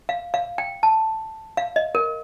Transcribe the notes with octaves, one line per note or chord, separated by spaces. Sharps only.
F5
F5
G5
A5
F5
D#5
A#4